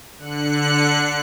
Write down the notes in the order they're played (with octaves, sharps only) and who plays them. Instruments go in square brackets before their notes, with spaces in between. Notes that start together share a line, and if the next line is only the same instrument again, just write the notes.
[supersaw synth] D3 F#6 C#7